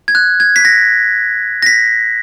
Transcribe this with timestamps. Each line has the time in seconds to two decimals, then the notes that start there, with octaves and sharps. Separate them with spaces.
0.08 G#6
0.15 F#6
0.40 G#6
0.56 B6
0.65 A#6
1.62 A#6
1.66 B6